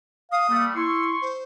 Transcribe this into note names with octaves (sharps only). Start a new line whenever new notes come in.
F5 D#6
G3 A3 A#3
E4 C6 C#6 E6
C5